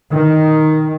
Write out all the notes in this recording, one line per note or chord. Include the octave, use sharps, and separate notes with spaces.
D#3